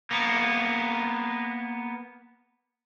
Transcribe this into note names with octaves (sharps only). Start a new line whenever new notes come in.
A#3 B3